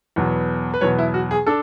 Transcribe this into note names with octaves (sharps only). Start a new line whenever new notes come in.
E2 B2 F#3 B3
B4
E2 B2 F#3 B3 C#5
E4
F#4
G#4
D4 A4